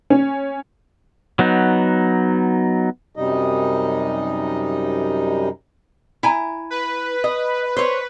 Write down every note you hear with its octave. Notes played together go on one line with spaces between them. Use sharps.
C#4
F#3 B3 D#4
F#2 C3 G3 D#4 D#5
E4 G#5 A#5
B4
D#5
C5 C#5